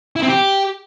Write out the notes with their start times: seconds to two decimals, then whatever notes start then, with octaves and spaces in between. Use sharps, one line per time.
0.16 E4
0.22 C4
0.29 G4